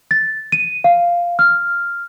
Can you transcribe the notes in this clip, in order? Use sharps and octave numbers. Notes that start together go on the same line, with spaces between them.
A6
D#7
F5
F6